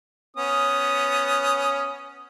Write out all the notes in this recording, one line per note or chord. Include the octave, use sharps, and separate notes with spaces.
B3 C#4 D#6